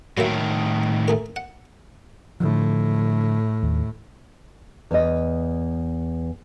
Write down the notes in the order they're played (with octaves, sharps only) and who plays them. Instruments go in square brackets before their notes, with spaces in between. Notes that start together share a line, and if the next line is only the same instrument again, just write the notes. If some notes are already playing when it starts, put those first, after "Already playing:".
[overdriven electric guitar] A2 D#3 [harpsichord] F#3 A#3 E5
[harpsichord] A3 G#4 A#4
F#5
[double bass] A2 [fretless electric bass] D3 F3
[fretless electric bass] D#2
[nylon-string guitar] E2 D#5